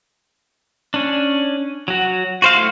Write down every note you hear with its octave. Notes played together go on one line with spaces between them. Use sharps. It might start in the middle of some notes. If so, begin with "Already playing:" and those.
C#4 D4
F#3 F#4
F#4 C5 F5
A3 E4